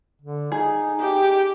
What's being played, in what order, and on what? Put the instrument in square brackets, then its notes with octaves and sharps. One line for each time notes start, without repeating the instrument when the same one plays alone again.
[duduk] D3
[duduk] D#4 [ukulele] G#4
[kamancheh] G4